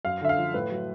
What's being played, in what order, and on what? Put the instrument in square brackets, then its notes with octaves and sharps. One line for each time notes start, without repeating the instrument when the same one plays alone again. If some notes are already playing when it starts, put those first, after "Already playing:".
[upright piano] F#2 F5
D3 E5
F5
F3
A2 B4
F#3